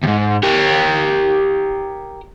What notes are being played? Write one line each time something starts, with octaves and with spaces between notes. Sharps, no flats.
D#2 G#2
G4 A#4